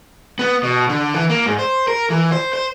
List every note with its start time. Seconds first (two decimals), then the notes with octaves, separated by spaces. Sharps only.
0.39 B3
0.63 B2
0.89 D3
1.14 E3
1.30 A#3
1.46 G#2
1.59 C5
1.88 A#4
2.10 E3
2.32 C5
2.53 C5